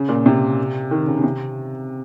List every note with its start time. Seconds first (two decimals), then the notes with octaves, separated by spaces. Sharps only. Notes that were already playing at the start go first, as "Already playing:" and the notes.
Already playing: C#3
0.09 A#2
0.26 C3
0.91 D#3
1.07 C#3
1.18 C#3
1.24 C3